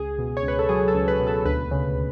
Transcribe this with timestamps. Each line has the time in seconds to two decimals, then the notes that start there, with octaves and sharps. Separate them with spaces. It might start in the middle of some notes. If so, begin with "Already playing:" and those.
Already playing: C#2 G#4
0.19 B2
0.37 C#5
0.43 C#2 B4
0.59 A4
0.69 F#3 G#4
0.88 A4
0.94 C#2
1.08 B4
1.20 B2
1.27 A4
1.45 D2 B4
1.71 C#3